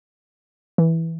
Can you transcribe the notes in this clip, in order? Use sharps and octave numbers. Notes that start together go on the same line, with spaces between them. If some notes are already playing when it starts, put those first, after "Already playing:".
E3